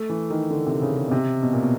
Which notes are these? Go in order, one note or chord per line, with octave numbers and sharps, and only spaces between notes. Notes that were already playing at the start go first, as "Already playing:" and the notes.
Already playing: A3
E3
D#3
D3
C3
C#3
C#3
B2
C3
B2
A#2
B2